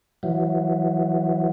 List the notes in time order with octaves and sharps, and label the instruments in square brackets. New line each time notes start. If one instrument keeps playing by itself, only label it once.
[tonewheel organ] E3 F#3